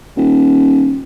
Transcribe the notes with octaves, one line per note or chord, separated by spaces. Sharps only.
D#1